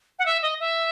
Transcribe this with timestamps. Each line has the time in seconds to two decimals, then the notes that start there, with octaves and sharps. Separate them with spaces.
0.19 F#5
0.26 E5
0.42 D#5
0.60 E5